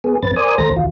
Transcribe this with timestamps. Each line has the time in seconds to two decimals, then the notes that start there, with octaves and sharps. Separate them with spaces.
0.04 B3 G#4
0.23 F#2 C4 B4 A6
0.36 A#4 C5 D5 G#5 D#6
0.58 D#2 A3 C5 A#5 A#6
0.76 D#2 F4